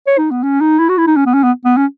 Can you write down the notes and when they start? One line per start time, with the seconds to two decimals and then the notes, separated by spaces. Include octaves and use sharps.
0.07 C#5
0.18 D#4
0.31 B3
0.43 C#4
0.60 D#4
0.79 E4
0.89 F#4
0.98 E4
1.07 D#4
1.16 C#4
1.26 B3
1.34 C#4
1.43 B3
1.65 B3
1.77 C#4